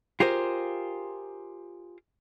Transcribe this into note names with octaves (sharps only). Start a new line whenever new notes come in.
F4 G4 G#4 A#4 C5